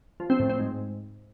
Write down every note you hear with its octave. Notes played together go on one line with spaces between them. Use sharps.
F3
C4
A2
C4
G#2